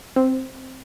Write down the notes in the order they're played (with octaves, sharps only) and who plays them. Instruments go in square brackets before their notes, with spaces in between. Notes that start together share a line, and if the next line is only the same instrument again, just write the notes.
[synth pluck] C4